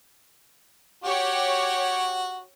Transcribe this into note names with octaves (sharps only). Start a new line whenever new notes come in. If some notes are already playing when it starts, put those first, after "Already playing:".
F#4 G4 C#5